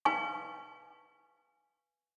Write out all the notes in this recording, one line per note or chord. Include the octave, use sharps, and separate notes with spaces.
B4 F5 G#5 C#6